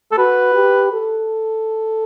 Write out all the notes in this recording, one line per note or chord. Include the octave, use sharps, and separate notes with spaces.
A4
F#4 B4
G4
A4